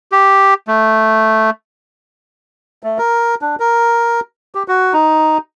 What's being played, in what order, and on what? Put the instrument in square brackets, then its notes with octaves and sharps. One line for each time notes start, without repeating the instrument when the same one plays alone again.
[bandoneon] G4
A3
[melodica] A3
A#4
D4
A#4
G4
F#4
D#4